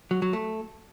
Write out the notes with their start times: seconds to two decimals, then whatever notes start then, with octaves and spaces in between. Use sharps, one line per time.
0.11 F#3
0.22 F#3
0.33 A3